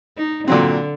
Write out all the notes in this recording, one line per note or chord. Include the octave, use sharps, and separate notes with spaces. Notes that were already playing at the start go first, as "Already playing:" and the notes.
D#4
A#2 D3 F#3 C4